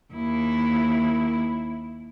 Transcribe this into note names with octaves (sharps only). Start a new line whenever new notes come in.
D#2 E4